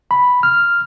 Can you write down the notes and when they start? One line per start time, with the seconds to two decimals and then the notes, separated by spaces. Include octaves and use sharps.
0.11 B5
0.43 F6